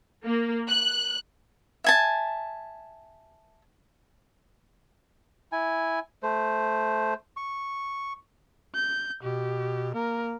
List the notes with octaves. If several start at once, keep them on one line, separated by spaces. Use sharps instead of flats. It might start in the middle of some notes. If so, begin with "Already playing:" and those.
A#3
F#6
E5 G#5 A5
E4 G#5
A3 C5
C#6
G6
B2 G4
A#3 A#4